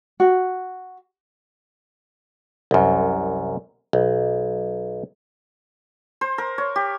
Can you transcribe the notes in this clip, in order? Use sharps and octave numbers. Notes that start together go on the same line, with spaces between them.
F#4
C2 F#2
B1
C5
A#4
C#5
G4